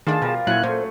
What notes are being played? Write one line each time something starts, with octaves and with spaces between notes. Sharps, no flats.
D#3 A3 D4 F4 G#4 A5
B2 F3 G3 A#4
F#2 A#2 F#3 E4 F#5 G#5 F#6
A#2 A3 C5